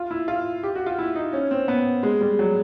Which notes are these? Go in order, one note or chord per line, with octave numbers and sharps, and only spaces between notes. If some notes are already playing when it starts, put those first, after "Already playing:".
Already playing: F4
E4
F4
G4
F#4
F4
E4
D#4
C#4
C4
B3
G#3
G3
F#3